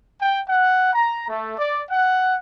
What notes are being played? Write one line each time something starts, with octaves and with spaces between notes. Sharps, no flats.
G5
F#5
A#5
A3
D5
F#5